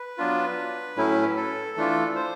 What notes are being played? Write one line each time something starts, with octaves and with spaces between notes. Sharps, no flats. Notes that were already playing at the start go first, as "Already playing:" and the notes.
Already playing: B4
F#3 B3 D4 F4
A2 F#3 A3 C#4 E4
A4
E3 A3 D4 F4
C5